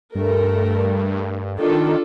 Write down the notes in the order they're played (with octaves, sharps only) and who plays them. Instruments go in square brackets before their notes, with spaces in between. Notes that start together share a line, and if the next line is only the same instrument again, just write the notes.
[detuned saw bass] G2 [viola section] A3 A#4
[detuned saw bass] D#3 [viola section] D4 F4 A4